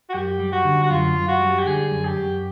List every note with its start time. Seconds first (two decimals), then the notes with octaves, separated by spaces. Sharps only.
0.09 F#4
0.14 F#2 G4
0.39 G3
0.52 F#4
0.65 D3
0.83 F#4
0.90 F#2 F4
1.15 F#2
1.28 F#4
1.41 G3
1.59 G4
1.66 D3 G#4
1.91 F#2
2.04 G4
2.17 F#2